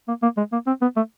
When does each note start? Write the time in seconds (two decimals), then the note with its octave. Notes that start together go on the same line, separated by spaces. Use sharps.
0.08 A#3
0.23 A#3
0.37 G#3
0.52 A#3
0.67 C4
0.82 B3
0.96 A3